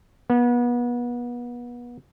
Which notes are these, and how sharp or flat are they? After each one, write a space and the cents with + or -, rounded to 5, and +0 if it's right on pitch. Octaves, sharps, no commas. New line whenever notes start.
B3 -30